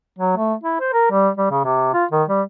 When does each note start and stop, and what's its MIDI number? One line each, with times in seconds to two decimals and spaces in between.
0.19 0.36 54
0.37 0.54 57
0.64 0.77 64
0.80 0.92 72
0.93 1.09 70
1.11 1.28 55
1.37 1.50 55
1.51 1.64 49
1.65 1.90 48
1.93 2.05 65
2.12 2.23 51
2.28 2.42 55